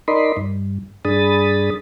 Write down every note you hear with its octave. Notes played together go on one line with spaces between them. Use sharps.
D#4 A#4 D5 D#5 B5 C6
G2
G2 D4 G#4 B5 D#6 A6